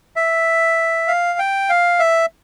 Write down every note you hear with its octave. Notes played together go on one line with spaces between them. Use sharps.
E5
F5
G5
F5
E5